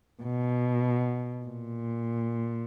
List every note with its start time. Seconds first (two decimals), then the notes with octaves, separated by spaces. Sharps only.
0.23 B2
1.45 A#2